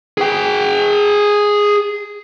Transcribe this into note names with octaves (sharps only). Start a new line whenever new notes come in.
G#4 G5